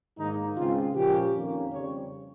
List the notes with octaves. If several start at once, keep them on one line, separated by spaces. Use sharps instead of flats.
G#2 D#3 A#3 D#4
C#2 C#3 G#3 C4 F4
A#2 F3 A#3 C#4 G4
F2 D#3 A#3 C#4
F2 C#3 G3 C4 C#5